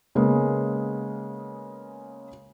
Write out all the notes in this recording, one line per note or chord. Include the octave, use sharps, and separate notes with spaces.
C#3 G#3 A#3 B3